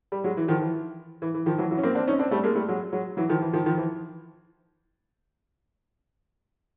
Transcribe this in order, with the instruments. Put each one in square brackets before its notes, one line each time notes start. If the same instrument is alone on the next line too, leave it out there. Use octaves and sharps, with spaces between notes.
[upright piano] G3
F#3 G#3
E3
D#3 F3
E3
E3
E3
D#3 F3
E3 F#3
E3 F#3
C#4
A#3 C4
C4 D4
C#4 D#4
C4 D4
G3 A3
G#3 A#3
G3 A3
F#3 G#3
F#3 G#3
E3 F#3
D#3 F3
E3
D#3 F3
D#3 F3
E3